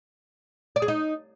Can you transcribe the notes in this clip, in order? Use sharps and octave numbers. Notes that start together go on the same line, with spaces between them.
D5
G#4
D#4